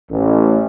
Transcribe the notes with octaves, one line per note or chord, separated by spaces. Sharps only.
A1